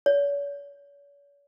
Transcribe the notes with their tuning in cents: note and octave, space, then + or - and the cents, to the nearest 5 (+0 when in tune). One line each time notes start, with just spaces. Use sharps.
C#5 +40